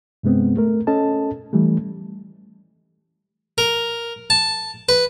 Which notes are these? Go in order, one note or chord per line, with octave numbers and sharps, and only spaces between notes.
G2 C3 G#3 B3 C4
A3 A#4
C#4 A4 D#5 A5
E3 G3 A3
A#4
A5
B4